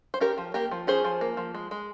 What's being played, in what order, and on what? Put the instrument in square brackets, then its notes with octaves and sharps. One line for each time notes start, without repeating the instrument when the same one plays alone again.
[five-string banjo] C5
C#4 G4 A#4
F3
A#3 G4 A#4
F3
C#4 G#4 C5
F3
A#3
F3
G#3
G#3